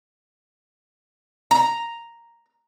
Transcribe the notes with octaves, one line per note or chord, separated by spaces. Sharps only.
A#5